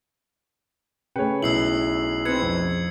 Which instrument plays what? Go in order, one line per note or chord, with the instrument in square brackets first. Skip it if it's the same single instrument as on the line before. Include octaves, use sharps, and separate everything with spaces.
[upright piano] C#3 A3 [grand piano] B4 C#5 [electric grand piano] G5 C#7
[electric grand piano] B1 E4 [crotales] E6 C7 F#7
[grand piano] C4 B4 [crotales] G#6 C#7
[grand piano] F2